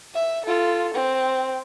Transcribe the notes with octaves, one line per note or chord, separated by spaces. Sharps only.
E5
F4 A4
C4